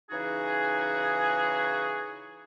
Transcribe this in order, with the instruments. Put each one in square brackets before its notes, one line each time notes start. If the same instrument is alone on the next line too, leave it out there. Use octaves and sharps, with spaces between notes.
[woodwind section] C#3 E3 D#4 F#4 G#4